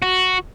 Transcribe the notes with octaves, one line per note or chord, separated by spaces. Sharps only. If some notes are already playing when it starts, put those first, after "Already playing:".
F#4